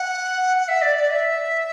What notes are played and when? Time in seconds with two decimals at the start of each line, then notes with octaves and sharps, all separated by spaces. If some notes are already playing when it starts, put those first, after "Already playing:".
Already playing: F#5
0.57 F#5
0.68 E5
0.82 D5
0.96 D5
1.10 E5